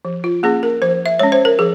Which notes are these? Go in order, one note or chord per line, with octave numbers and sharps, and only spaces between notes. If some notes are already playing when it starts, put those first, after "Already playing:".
F3
F4
A#3 C#4 G#4
A#4
F3 C5
E5
G#3 C#4 C#5
C5
A#4
F3 G#4